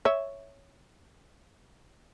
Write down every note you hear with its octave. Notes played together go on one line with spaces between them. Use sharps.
C#5 E5